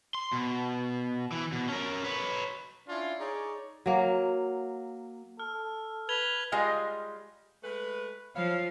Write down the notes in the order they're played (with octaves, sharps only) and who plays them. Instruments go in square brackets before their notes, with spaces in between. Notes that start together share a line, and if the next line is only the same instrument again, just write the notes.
[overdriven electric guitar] C6
B2
E3
B2
C#4 A#4
B4 C#5
[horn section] C#4 D4 E4 F4
D#4 G#4 C#5 D5
[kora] F#3 A#3
[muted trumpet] A4 [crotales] F6
[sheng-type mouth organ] B4 [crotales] G#6 F7 G7
[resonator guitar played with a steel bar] G3 G#3 F4 D#5 F5
[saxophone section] G#3 A3 B4
[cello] F3 [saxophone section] E4 C#5 F5